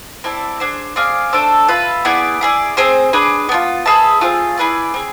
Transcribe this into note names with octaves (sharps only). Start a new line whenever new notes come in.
C4 E4 A4 D5
D4 G#4 C5
C4 G#4 D5 F5
A3 D4 A4 C5
F4 B4 E5
B3 E4 G#4 D5
E4 G#4 D5
C4 G#4 C5
D4 G#4 B4
B3 D4 F4
G#4 B4 E5 A5
A3 C4 F4 G#4
E4 G#4 B4 D5
C4 G#4